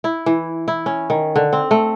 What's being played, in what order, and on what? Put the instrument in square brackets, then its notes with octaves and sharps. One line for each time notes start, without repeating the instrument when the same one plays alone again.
[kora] E4
E3
E4
C#4
D#3
D3
C4
A3